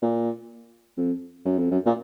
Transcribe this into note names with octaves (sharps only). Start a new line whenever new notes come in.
A#2
F2
F#2
F2
F#2
A#2